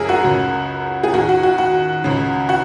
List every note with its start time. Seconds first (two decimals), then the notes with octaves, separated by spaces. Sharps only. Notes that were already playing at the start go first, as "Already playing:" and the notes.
Already playing: F#2 C#3 G#4 A#4
0.09 F#4
0.23 C#2 C#3
1.03 G#4
1.14 D#2 D#3 F#4
1.29 F#4
1.43 F#4
1.58 F#4
2.04 C#2 C#3
2.49 F#4